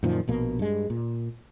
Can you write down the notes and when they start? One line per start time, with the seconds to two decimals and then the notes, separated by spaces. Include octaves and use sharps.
0.03 F#2 A#2 D#3 F3
0.28 A#1 B2 A#3
0.59 G2 G#3
0.90 A#2